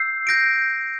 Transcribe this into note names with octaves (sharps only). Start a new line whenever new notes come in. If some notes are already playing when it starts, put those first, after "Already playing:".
Already playing: E6 G6 C7
G6 A#6 D7